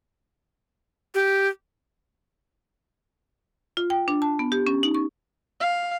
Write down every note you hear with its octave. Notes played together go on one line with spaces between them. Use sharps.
G4
F4
G5
D4
A5
B3
G4
C#4
D#4
C#6
F5